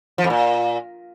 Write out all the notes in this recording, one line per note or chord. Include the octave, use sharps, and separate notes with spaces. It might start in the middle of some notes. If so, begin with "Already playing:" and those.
F3
F2
A#2